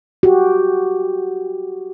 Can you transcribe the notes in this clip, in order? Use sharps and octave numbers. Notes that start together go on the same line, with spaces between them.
F#4 G4